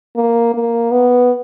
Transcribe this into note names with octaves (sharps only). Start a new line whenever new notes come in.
A#3
A#3
B3